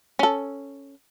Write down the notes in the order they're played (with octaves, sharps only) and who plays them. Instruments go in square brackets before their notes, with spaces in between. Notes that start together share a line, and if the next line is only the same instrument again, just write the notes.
[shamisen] C#4 A4